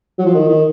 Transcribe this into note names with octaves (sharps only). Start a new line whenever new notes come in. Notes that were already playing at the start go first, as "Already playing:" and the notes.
F#3
F3
D#3
D#3